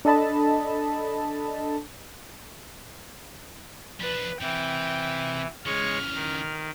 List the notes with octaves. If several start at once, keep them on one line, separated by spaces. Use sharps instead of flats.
D4 A4 D#5 A5 B5
F3 D4 B4
C3 E3 G5
C#3 E3 G#3 C#5 C#6 F6
D#3